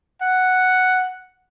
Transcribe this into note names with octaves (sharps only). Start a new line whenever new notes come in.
F#5